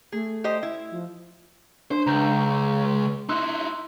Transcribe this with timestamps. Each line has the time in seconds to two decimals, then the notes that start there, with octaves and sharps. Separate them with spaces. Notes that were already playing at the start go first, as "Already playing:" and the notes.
0.12 A3 G#4
0.44 G4 C5 D#5
0.63 E4
0.91 F3
1.91 D4 C5
2.07 C#2 A#5 G6
3.29 D#4 E4 C6 E6 F#6